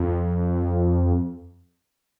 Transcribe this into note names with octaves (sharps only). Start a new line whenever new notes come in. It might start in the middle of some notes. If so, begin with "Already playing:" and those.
Already playing: F2